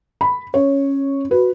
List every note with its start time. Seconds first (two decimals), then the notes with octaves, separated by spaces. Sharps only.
0.21 B5
0.54 C#4 C#5
1.31 F#4 B4